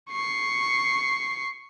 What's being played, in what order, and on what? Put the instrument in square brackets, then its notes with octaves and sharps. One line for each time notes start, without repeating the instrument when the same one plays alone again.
[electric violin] C#6 C7